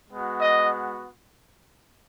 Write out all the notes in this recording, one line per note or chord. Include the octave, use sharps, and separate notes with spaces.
G#3 B3 F#4
D#5